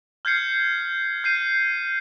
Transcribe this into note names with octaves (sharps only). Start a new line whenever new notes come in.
F6 G6 G#6 C7 C#7
G6 C7 D#7